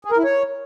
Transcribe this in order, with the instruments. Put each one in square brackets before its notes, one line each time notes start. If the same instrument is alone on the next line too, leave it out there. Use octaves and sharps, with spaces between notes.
[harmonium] G#4
A#4
E4
C#5